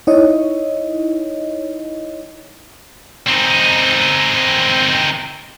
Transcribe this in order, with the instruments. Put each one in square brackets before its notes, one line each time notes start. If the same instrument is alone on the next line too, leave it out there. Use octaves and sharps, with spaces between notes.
[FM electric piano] D#4 E4 C#5 D#5
[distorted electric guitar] C4 D#4